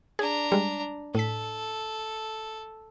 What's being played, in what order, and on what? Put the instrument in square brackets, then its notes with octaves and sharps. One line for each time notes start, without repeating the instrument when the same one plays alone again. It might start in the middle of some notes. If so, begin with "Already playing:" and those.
[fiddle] D4 A#5 [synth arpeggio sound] G#4
[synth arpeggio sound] G3 G#3
[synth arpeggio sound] A2 B6 [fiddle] A4